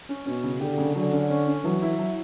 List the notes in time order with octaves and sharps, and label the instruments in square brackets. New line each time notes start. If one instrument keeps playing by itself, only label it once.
[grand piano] C#4
[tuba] B2 [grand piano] C#4
[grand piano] C#3
[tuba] D3 [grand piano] G4
[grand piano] C#3
[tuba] D3 [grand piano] F#3
[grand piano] C#4
C#4
C#4
[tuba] E3 [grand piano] F#3
[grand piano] E4
F#3